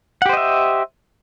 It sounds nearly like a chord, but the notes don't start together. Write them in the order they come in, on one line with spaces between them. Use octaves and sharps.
F#5 G4 C5 D#5 E5